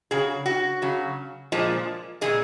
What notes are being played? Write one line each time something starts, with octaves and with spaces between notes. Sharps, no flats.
C#3 F#3 G#4
F#4
C#3 F#3
A#2 F3 G#3
A#2 F3 G#3 G#4